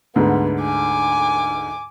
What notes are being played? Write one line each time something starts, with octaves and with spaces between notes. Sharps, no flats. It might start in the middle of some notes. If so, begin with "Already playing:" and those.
D2 G#2 D3 B3
G#5 D6